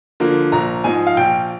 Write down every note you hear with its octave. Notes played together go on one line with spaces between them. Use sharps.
D3 F3 A#3
A#1 A#5
G#2 F3 G#3 G#5
F5
A#1 G5